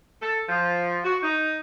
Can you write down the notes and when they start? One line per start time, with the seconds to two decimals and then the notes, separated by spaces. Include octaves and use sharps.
0.22 A4
0.49 F3
1.04 F#4
1.23 D#4